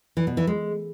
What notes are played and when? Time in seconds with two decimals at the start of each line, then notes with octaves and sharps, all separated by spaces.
0.17 E3
0.27 B2
0.37 E3
0.47 G#3